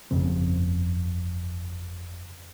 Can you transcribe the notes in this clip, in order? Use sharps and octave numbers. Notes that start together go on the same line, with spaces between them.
G1 F2 C#3 C4